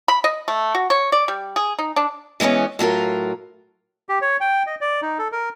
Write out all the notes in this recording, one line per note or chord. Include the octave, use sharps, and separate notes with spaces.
B5
D#5
A3
F#4
C#5
D5
G3
G#4
D#4
D4
E3 G#3 A#3 B3 C#4
A2 F#3 F4 A#4
G4
C#5
G5
D#5
D5
D#4
A4
A#4